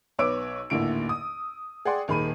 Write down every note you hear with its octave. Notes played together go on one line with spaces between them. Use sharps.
B1 B4 C#5 D6 E6 D7
A1 D#2 A#2 D3 E4 D7
D#6
G#4 D5 F#5 G5 C6
D#1 D#3 G#4 B5 D#7